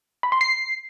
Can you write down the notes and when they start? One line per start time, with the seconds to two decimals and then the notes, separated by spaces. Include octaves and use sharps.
0.23 B5
0.32 C6
0.41 C7